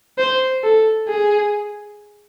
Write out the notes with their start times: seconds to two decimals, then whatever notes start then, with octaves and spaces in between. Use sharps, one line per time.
0.18 C5
0.64 A4
1.08 G#4